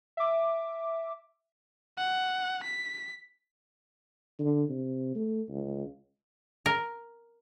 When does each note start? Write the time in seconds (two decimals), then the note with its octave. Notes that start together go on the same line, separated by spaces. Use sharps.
0.17 E5 D6
1.97 F#5
2.63 B6
4.39 D3
4.69 C3
5.15 A3
5.49 C#2
6.66 A#4